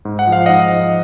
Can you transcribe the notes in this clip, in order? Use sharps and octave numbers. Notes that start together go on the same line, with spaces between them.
G#2
F#5
F3
F5
G#2 D#5 F#5
F3